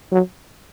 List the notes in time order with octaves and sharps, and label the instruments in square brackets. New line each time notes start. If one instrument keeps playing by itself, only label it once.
[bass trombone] F#3